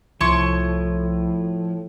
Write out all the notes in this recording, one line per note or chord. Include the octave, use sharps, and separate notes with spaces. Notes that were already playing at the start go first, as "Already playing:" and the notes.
C2 A2 F3 E4 C6 C#6